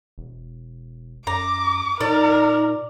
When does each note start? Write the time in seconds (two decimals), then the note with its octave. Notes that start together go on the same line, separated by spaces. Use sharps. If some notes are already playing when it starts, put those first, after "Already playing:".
0.18 E1
1.27 F#2 A#5 D6
2.01 A#2 D#4 A#4 D5